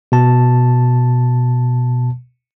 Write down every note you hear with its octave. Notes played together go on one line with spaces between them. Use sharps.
B2 A5